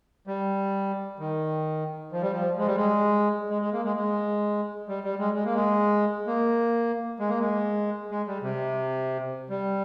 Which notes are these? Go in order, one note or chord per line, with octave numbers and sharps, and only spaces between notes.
G3
D#3
F3
G3
F3
G#3
G3
G#3
G#3
G#3
A#3
G#3
G#3
G3
G3
G#3
G#3
A#3
G#3
A#3
G#3
A#3
G#3
G#3
G3
C3
G3